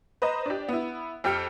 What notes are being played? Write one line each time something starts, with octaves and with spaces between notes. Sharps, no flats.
B4 C5 D#5 A#5
D4 G4
B3 E4
F2 G4 G5 F6 C#7